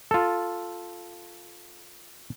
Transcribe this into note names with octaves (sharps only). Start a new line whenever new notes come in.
F4 A4